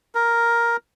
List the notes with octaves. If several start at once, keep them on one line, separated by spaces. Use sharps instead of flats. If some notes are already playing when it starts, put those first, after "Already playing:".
A#4